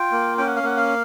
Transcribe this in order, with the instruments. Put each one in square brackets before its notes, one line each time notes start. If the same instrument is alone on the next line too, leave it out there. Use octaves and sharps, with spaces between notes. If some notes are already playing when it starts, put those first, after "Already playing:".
Already playing: [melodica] F4 G5
A#3
C#4 G5
F#5
F5
A#3 F#5
F5